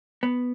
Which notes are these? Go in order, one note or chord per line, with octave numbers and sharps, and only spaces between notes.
B3